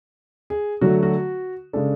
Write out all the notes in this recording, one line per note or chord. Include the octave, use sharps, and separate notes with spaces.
G#4
D3 F#3 A3 F#4
F#4
C#3 G#3 D4 A4